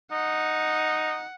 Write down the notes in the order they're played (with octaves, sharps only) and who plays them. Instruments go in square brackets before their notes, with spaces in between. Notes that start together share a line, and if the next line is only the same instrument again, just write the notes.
[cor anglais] D#4 [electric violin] F#5